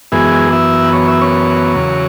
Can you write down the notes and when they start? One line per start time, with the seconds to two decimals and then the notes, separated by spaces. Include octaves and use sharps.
0.12 F#2 E3 G#3 B3 E4 G#4
0.52 E4 E5
0.93 C#5
1.08 E5
1.21 C#4 C#5
1.75 E2 C#3 F#3